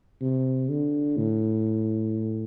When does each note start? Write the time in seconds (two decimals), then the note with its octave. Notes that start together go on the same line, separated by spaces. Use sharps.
0.21 C3
0.69 D3
1.17 A2